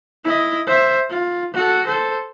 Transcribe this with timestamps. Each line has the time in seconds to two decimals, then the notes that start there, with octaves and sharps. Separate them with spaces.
0.24 E4 D#5
0.67 C5 E5
1.10 F4
1.54 F#4 A4
1.86 A4 C5